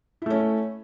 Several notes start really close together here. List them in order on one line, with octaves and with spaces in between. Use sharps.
E4 A3 C#4